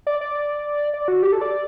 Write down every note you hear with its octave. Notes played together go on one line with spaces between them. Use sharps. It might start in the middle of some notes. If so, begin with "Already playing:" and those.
D5
D5
D5
F#4
G4
A4
D5